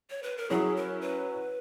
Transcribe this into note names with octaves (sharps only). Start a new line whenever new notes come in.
C#5
B4
A#4
F#3 C#4 E4 G#4
A#4
B4